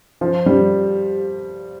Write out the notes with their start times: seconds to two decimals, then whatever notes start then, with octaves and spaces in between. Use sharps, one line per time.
0.21 F3
0.46 G3